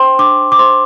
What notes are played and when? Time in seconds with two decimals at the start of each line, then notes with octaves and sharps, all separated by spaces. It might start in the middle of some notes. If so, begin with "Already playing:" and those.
Already playing: D4 C5 G5 C6
0.19 D4 D6
0.52 D6
0.59 C5 C6